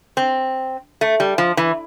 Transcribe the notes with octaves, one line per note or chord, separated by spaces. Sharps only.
C4
A3
G3
F3
E3